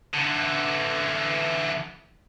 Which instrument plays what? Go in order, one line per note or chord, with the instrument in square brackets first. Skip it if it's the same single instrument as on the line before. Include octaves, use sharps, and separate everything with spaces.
[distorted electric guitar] D3 E3